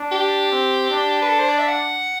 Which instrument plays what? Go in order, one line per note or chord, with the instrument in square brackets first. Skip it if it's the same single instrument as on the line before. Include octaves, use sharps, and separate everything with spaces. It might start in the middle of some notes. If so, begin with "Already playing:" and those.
Already playing: [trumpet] D4
[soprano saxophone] G4
[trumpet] C4
D4
[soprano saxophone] B4
A4
C5
D5
E5
F#5